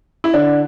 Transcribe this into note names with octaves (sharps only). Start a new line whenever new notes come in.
E4
D3 D4